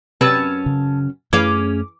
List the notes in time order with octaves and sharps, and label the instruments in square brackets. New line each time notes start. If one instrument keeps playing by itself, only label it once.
[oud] F#2 C#4 B4 [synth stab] C3 [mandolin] A5 E6
[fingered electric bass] C#3
[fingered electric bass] F#2 A3 [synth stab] E3 [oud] C#4 G#4 F5 [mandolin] D6